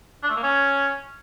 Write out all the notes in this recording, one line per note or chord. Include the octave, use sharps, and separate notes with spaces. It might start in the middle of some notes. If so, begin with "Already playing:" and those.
D4
A3
A#3
C#4